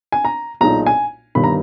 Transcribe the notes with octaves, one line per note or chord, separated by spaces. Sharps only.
G#5
A#5
B1 A#2 G#3 D#4 A#5
G#5
G1 G2 D#3 G3 B5
A#5